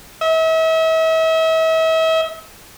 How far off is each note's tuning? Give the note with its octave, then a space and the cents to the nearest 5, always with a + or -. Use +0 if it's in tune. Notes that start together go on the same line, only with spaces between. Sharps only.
E5 -40